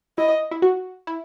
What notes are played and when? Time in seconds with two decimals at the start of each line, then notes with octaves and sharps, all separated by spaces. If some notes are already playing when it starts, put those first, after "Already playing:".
0.18 E4 D#5
0.51 E4
0.62 F#4
1.07 E4